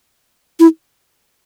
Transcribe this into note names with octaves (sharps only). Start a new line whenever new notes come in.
E4